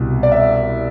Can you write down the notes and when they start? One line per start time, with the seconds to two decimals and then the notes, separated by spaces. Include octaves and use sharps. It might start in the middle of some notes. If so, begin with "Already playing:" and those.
Already playing: C2 B2
0.23 D5
0.32 E5